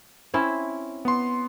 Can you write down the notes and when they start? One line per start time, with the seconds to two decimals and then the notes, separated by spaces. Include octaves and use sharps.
0.34 C4 C#4 E4
1.05 B3 C6